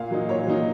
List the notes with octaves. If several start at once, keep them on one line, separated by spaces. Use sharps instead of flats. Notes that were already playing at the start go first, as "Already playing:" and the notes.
Already playing: A#2 F5
F#3 A#3 D#4
A#2 C#5
F#3 A#3 D#4